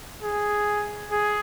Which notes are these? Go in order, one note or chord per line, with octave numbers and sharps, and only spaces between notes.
G#4
G#4